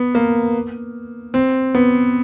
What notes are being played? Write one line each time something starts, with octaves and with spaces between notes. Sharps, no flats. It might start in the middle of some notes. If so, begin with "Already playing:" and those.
Already playing: B3
A#3
C4
B3